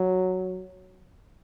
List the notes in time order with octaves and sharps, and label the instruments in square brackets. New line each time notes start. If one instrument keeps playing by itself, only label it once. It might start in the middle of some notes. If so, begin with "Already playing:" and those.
Already playing: [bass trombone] F#3